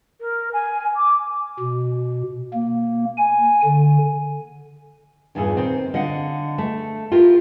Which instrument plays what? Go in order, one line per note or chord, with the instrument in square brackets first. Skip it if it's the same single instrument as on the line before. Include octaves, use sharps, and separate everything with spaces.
[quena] A#4
G#5
D6
[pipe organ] B2
A#3
G#5
D3
[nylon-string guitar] E2 G2 A#2 D#3 G#4 A4
D#3 C4
D3 D#5 F5 F#5
A3
E4 F4 G4 A4 A#4